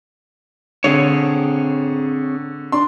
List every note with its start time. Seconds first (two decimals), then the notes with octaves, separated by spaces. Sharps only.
0.84 D3 C4 G#4 C#5
2.72 D4 C6